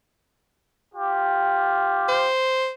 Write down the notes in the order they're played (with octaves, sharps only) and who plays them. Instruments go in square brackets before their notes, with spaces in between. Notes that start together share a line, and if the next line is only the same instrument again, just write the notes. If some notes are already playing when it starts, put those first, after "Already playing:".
[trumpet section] F4 G4
[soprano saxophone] C5